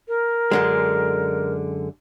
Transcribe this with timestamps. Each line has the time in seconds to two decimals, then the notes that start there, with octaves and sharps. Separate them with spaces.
0.08 A#4
0.51 F#2 D3 G#3